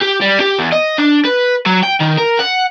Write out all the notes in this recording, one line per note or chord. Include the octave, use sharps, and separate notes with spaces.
G4
G3
G4
E2
D#5
D4
B4
F#3
G5
D#3
A#4
F#5